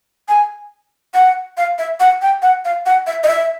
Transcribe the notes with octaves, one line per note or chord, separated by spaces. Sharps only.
G#5
F#5
F5
E5
F#5
G5
F#5
F5
F#5
E5
D#5
E5